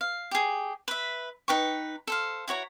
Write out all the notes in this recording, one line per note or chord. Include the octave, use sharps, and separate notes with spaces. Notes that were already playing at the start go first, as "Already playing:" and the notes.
F5
G4 G#4
B4 E5
D#4 B4 G5 C#6
A4 C5 F5
E4 F#4 C#5 A#5